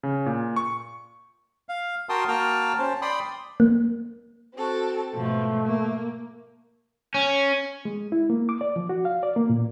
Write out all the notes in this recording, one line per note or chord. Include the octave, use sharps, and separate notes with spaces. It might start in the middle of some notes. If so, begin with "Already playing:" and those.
C#3
A#2
C#6
F5
F#4 A#4 G5 A5 C6 D#6
A#3 F#4 G5 A5 F6
C#4 C5 A5
D5 G5 B5 C6 D#6
A#3
C4 F#4 A4
G#2 B2 F3 A3
A#3
C#4
G#3
E4
A#3
D6
D5
F3
F#4
F5
D5
A#3
A#2